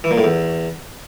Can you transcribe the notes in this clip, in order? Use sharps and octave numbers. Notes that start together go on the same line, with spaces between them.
E3
A#2
A2
E2